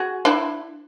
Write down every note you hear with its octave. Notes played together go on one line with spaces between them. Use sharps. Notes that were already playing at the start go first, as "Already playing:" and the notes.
Already playing: F#4 G#4
D4 E4